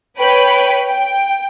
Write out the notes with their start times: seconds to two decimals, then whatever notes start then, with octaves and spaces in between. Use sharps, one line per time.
0.18 B4 C#5 G5 B5
0.88 G5